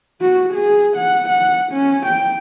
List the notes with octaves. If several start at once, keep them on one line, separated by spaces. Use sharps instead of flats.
F#4
G#4
F#5
F#5
C#4
G5